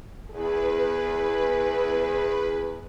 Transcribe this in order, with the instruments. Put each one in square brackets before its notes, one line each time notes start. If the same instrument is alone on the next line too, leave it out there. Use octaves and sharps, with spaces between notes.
[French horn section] E2 G#4 [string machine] B4